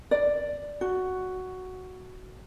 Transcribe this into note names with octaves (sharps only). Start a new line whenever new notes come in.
D5
F#4